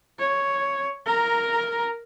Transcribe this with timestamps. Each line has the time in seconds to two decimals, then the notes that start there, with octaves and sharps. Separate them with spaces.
0.19 C#5
1.06 A#4 A#5